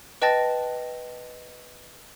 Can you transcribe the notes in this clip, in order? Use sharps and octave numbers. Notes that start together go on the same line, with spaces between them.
B4 D#5 G5 A5 A6 A#6